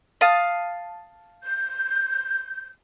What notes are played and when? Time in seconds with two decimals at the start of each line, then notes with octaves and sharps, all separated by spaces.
0.21 F5 A5 D#6
1.44 G6